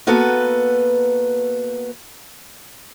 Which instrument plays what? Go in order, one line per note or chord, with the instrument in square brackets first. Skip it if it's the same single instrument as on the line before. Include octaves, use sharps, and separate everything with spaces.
[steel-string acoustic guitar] A#3 B3 F#4 A4 B4